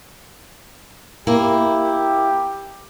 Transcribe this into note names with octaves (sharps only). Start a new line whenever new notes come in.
A#3 E4 G4